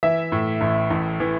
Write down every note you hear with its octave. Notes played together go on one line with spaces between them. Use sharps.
E3 E5
A2
A1
A1
E3